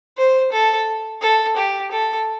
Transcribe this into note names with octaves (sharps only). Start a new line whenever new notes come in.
C5
A4
A4
G4
A4